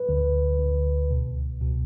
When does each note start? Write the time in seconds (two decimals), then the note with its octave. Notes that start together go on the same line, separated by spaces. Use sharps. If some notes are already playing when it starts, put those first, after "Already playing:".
Already playing: B4
0.09 D2 D3
0.59 D2 D3
1.11 C#2 B2
1.61 C#2 B2